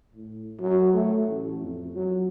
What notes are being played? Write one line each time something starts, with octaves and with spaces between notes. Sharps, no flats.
A2
F#3
A3
A1
F2
F#3